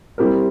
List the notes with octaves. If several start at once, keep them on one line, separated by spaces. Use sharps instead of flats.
G3 C4 E4 G4 A#4